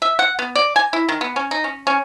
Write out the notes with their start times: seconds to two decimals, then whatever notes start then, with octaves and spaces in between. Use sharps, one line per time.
0.02 E5
0.19 F#5
0.39 B3
0.55 D5
0.76 G#5
0.93 E4
1.09 D#3
1.21 B3
1.36 C#4
1.51 D#4
1.64 C#4
1.87 C#4